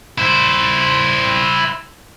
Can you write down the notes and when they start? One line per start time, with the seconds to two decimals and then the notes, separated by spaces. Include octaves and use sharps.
0.18 E4 C5